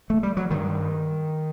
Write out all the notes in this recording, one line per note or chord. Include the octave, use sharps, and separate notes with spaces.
A3
G3
F#3
G2 D#3